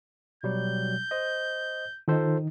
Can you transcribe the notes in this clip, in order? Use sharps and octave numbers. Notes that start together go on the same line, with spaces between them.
B2 F#3 G3 G6
C5 D#5
D#3 D#4 F4 A4 C5